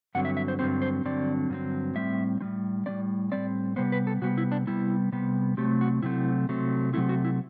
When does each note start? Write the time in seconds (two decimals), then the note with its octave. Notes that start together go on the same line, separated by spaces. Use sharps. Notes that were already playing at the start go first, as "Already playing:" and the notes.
0.15 G2 D3 F#3 C4 F#5
0.25 E5
0.37 E5
0.48 C5
0.59 G2 D3 F#3 C4 C5
0.82 C5
1.04 G2 D3 F#3 C4 D5
1.50 G2 D3 F#3 C4
1.95 A2 G3 C4 E5
2.41 A2 G3 C4
2.86 A2 G3 C4 D5
3.32 A2 G3 C4 D5
3.76 C3 G3 B3 C5
3.92 B4
4.07 A4
4.21 C3 G3 B3 F#4
4.38 E4
4.52 D4
4.67 C3 G3 B3 E4
5.12 C3 G3 B3
5.57 C3 F#3 A3 C4 G4
5.81 F#4
6.03 C3 F#3 A3 C4 E4
6.49 C3 F#3 A3 C4
6.93 C3 F#3 A3 C4 E4
7.09 F#4
7.25 E4